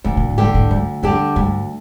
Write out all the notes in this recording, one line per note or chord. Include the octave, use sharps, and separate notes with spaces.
D2 A2
A#2
A2
A#2 D3 G3 D4 G4
A2
D2 G2
F2 D3 G3 D4 G4
D2 G2